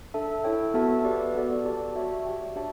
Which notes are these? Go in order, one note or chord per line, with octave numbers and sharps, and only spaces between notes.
D4 A4 E5 A5
E4 A4 C#5 G5
B3 F#4 A4 E5 A5
G4 B4 D5
B3 F#4 A4 D5
G4 D5 A5
F#4 C#5 E5 A5
G4 D5 G5
D4 G4 C#5 E5 A5